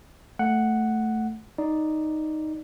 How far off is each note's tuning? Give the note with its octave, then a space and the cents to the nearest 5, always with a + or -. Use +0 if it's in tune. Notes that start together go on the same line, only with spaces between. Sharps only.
A3 +0 F#5 +0
D#4 +0 D5 +0